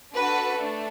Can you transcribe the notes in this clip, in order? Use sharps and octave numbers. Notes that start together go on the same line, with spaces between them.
D4 F#4 A4 B4
A3 D4